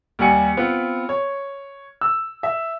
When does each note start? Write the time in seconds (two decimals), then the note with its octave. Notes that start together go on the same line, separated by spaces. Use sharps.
0.19 D#2 G3 F#5 G#5 C#7
0.57 B3 C4 F4 B4
1.09 C#5
2.01 E6
2.43 E5